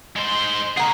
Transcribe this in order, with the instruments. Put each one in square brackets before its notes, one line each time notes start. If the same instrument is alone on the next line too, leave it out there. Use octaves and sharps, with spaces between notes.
[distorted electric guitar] G#3 C5
[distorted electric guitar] C#3 G#4 [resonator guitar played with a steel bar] A#3 F#5